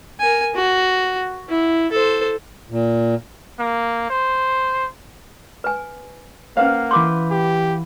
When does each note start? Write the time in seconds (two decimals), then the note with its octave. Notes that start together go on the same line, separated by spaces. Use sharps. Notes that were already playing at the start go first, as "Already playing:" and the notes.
0.20 A#4 G#5
0.55 F#4
1.49 E4
1.91 A4 C5
2.70 A#2
3.59 A#3
4.10 C5
5.64 B4 G#5
6.57 A#3 C#4 B4 C5 F5 F#5
6.91 E3 B4 C6 D6 G6
7.31 G4